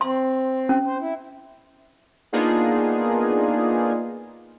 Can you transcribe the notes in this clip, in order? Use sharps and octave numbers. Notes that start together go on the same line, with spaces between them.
C4 C6
C#4
C5
E4
A#3 B3 D4 D#4 F4 G#4